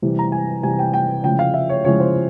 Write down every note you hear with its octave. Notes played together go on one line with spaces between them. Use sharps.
C3 E3 G3
A#5
G#5
C3 E3 G3 G#5
G5
G5
C#3 F3 G#3 E4 G5
F5
E5
C#5
C#3 F3 G#3 E4 C#5
C5